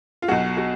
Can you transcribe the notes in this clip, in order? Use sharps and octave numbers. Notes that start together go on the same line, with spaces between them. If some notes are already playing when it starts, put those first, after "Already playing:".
F4
B1 B2 F#3 F#4
F#4